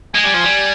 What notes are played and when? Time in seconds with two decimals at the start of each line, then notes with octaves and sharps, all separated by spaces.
0.15 G#3 G#5
0.24 G3
0.34 F3
0.44 G3